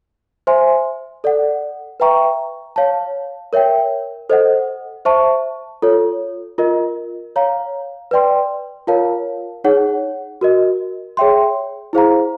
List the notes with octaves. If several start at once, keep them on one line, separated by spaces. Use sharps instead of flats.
C5 E5 G#5 C6
A4 D5 F#5
B4 E5 G5 A#5 C#6
C#5 F5 A5
A#4 C#5 E5 G5
A4 C5 D#5 F#5
C5 E5 A5 C#6
F4 A4 C#5
F4 A#4 D#5
C#5 F5 A#5
B4 D5 G5 C6
F4 A#4 C#5 F5 A5
D#4 G#4 C#5 F#5
F#4 A#4 D#5
G#4 C#5 E5 G5 C6
E4 G#4 C5 F5 A#5